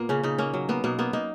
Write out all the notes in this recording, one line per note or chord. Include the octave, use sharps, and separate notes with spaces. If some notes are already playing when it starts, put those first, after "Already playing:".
Already playing: A#2 A#3 B3
C#3 C#4
C#3 D#4
A#3 C#4
F#3
A#3 B3
B2 A#3
A#3 B3
A#3 D#4